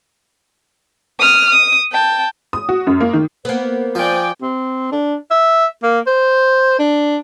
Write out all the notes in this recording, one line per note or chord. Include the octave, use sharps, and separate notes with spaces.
D#6 F6
D#6
G5 A5
D#6
F#4
F#2
A#3
D#3
A#3 B3 C5
F3 D5 G5 G#5
C4
D4
E5
A#3
C5
D4